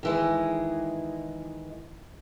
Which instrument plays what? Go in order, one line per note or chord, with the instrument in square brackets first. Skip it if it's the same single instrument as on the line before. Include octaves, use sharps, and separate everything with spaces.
[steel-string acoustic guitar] D#3 E3 G#3